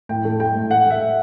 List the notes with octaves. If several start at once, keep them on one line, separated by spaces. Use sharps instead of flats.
A2 G5
A3
A3 G5
A2
A3 F#5
A3 E5